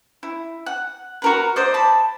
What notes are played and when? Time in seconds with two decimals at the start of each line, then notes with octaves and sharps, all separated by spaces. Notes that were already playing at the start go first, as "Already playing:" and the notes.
0.23 E4
0.66 F#5
1.22 F#4 A#4 B4
1.56 C5 D5 D#5
1.74 A5 B5